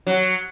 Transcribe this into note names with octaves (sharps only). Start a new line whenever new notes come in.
F#3